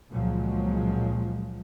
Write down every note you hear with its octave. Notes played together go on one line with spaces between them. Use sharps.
C#2 A#2 F3 F#3 G#3